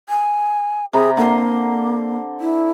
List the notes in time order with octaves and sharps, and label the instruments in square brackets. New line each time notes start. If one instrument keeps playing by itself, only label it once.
[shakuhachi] G#5
[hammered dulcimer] C3 A#5 B5 [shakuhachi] G#4
[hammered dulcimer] D3 C6 [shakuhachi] A#3
[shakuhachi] E4